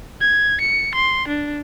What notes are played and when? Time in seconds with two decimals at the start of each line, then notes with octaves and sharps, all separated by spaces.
0.21 G#6
0.61 C#7
0.94 C6
1.28 D4